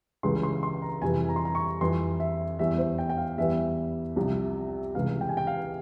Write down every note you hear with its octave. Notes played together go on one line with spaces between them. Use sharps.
C#2 C#3 E3 G3 C6
C6
C6
A#5
F2 C3 E3 G3 G#5
A#5
C6
A#5
C#6
F2 E3 G3 C6
E5
E2 E3 G3 E5
C5
G5
G5
F5
E2 E3 G3 E5
C2 C3 F3
C#2 C3 E3 G3 F5
G5
G#5
G5
F5